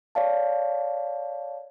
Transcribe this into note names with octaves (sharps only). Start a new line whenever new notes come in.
C#5 D5 F5 A5